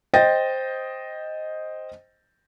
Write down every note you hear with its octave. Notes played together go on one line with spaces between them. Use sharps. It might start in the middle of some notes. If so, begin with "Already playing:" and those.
C5 D#5 G5 A6 A#6